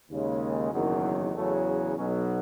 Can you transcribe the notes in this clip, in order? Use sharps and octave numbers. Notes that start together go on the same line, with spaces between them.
D#2 C#3 G#3
F#1 E2 D#3 F#3
E2 C#3 F#3 A3
B1 B2 F#3 C#4